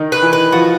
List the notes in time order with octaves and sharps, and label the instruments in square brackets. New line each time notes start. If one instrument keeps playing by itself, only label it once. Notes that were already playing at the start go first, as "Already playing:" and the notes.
Already playing: [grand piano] D#3 D#4
[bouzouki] B4
[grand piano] E3 E4
[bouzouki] B4
[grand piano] F3 F4 [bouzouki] F#4